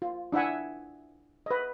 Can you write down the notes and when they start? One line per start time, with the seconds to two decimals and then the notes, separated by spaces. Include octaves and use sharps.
0.02 F4
0.32 D4 E4 E5 F#5 G#5
1.46 B4 D#5